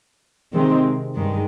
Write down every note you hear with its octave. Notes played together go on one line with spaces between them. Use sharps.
C3 D#3 G#3 C4
G2 D#3 G#3